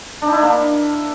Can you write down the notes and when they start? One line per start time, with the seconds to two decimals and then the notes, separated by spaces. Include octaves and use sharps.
0.22 D4
0.27 D#4
0.32 E4
0.37 D4
0.42 A#3